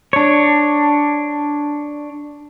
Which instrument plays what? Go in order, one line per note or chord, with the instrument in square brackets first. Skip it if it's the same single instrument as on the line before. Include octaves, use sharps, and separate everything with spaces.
[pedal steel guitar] D4 C#5